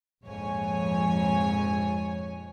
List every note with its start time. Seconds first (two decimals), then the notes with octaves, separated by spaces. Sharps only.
0.24 A#1 F2 G#2 C#5 G#5